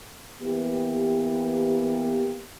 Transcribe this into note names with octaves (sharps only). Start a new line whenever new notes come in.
E3 A#3 B3 G4